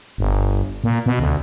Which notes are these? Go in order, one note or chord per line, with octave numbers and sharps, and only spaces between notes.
G1
A#2
B2
D2